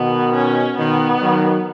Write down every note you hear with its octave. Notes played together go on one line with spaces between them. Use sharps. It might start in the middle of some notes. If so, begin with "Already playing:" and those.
Already playing: B2 D#3 B3
C#4
B2 D#3 B3
D#3 F#3